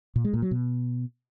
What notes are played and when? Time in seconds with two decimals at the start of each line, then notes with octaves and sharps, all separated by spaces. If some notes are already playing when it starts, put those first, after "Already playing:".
0.16 A#2
0.24 G#3
0.33 A#2
0.42 F#3
0.51 B2